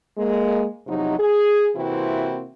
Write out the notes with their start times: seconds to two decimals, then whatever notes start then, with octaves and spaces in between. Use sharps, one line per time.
0.18 G#3 A#3
0.87 E2 C3 F3 F#3 D#4
1.19 G#4
1.76 C3 E3 A#3 C4 E4 F#4